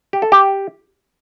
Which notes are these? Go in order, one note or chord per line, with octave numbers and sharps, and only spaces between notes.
G4
A4
G4